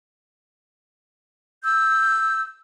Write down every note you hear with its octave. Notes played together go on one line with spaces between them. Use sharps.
E6 G6